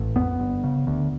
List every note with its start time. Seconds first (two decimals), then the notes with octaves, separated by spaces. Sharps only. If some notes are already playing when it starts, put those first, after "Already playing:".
Already playing: A1
0.16 F2 B3
0.39 G1
0.64 C#3
0.87 D2